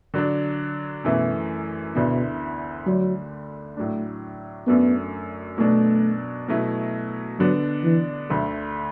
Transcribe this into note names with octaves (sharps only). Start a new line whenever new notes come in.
D3 F#3 D4
F#2 B2 E3 A3 E4
D2 B2 D3 B3 E4
D3 F#3 A3 D4
A2 F#3 A3 D4
F#2 F#3 A3 B3 D4
B2 F#3 A3 D4
B2 F#3 A3 E4
D3 F#3 B3 D4
E3
D2 D3 F#3 A3